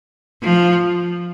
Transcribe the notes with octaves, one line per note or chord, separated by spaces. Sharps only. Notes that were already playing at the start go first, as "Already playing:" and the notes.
F3